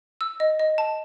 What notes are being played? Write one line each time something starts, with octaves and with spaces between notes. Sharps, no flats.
E6
D#5
D#5
A5